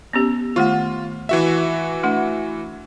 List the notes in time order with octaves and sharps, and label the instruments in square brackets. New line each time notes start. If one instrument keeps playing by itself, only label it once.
[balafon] B3 C#4 G4
[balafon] D#3 A3 F#5 [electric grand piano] F4
[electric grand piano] E3 F#4 E5
[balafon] A3 D4 F#5